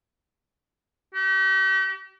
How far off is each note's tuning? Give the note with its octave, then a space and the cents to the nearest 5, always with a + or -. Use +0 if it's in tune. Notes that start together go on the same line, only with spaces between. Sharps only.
G4 -45